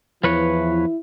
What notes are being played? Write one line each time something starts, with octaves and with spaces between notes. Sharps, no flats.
E2 E3 F3 E4 B4 C#5